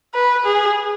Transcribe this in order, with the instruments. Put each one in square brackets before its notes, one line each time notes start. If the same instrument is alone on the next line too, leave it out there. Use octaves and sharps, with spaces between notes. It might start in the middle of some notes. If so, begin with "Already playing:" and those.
[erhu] B4
G#4